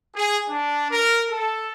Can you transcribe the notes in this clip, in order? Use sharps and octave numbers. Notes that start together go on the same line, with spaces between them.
G#4
D4
A#4
A4